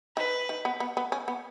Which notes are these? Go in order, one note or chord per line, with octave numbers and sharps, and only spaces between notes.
D#3 B4
D#3
B3
B3
B3
C#4
B3